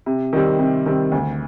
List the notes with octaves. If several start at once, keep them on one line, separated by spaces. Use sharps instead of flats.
C3
D#3 G3 C4
C3
D#3 G3 C4
D2